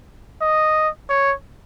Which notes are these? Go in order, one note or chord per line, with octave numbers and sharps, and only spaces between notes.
D#5
C#5